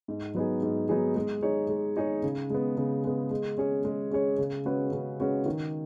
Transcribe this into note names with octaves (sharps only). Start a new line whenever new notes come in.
G#2
F#3 B3 D#4 G#4
G#2
F#3 B3 D#4 G#4
G#3
D#4 G#4 C#5
G#3
D#4 G#4 C#5
C#3
G#3 B3
C#3
G#3 B3
G#3
C#4 G#4 C#5
G#3
C#4 G#4 C#5
C#3
G#3 C#4 F#4 B4
C#3
G#3 C#4 F#4 B4
D#3